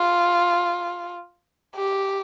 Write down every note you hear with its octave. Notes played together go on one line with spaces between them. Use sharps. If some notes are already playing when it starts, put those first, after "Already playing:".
Already playing: F4
G4